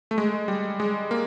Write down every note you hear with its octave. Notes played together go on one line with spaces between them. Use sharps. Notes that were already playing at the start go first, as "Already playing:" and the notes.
A3
G#3
G3
G#3
A#3